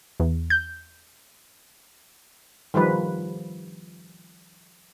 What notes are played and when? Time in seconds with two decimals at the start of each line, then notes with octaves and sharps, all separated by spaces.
0.20 E2
0.50 G6
2.74 D#3 F3 G3 B4